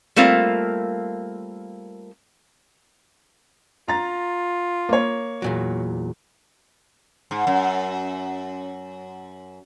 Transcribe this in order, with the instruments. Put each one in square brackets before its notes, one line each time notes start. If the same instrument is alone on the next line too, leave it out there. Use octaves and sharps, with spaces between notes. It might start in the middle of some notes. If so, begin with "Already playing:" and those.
[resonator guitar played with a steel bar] G3 A3 A#3 C4 F4
[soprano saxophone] F4 [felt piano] A#5 A6
[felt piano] A#3 C#5
[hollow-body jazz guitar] E2 A#2 F#3
[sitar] G#2
F#2